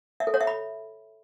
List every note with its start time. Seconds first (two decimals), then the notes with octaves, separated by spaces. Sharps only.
0.20 E5
0.27 A4
0.34 C#5
0.41 E5
0.47 B5